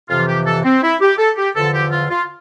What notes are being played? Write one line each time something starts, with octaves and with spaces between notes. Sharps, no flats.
F2 C3 E3 F4
G4
A4
C4
E4
G4
A4
G4
E2 D3 F3 A4
G4
F4
F4